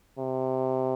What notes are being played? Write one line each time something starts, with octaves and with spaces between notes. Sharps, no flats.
C3